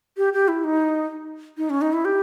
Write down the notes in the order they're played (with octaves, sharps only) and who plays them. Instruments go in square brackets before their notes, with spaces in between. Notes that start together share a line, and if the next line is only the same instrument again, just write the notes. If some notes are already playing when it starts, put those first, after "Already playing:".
[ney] G4
G4
E4
D#4
D#4
C#4
D#4
E4
G4